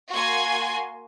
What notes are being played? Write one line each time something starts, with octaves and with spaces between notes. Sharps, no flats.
A#3 F#4 G#5 C6 G#6